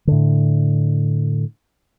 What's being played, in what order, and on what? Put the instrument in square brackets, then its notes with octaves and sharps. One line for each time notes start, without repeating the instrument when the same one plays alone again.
[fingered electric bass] A2 D3